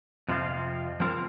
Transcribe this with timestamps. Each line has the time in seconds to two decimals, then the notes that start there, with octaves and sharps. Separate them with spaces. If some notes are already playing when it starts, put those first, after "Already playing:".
0.28 F2 C3 F3 C4 F4
1.00 F3 C4 F4 A#4